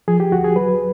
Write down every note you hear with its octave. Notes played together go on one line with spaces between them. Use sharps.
F3 G#4
G4
D2 F#4
G#4
F#3 B4